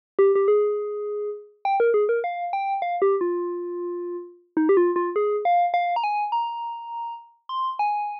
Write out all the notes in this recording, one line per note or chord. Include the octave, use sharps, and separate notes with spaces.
G4
G4
G#4
G5
A#4
G#4
A#4
F5
G5
F5
G4
F4
D#4
G4
F4
F4
G#4
F5
F5
A#5
G#5
A#5
C6
G#5